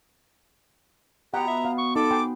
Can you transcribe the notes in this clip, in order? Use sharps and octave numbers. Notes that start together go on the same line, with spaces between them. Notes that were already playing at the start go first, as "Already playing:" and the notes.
B2 B3 G4 F#5 A#5
E5
F5
C#6
D#4 A4 D6
G5 G#5 C6